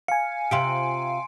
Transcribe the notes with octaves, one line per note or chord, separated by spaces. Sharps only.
F5 G#5 C#7
C3 F4 G4 C6 D7